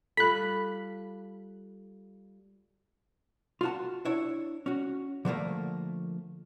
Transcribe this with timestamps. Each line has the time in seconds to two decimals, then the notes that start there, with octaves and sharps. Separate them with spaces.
0.17 G3 F4 A4 B5 F#6
3.61 F4 F#4 A5
4.05 D4 E4 C#5
4.66 C#4 F#4
5.25 D3 F3 A3 A#3